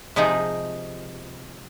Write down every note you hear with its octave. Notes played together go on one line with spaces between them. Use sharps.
C3 F3 G#3 D#4